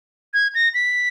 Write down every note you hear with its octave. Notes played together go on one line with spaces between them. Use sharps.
G#6
A#6
B6